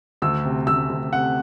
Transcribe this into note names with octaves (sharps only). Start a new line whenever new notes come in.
D2 E6
C3
D2 E6
D2
C3 F#5